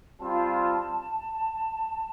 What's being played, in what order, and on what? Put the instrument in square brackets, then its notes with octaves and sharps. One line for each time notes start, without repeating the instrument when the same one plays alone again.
[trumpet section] G3 C4 F4 [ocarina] A5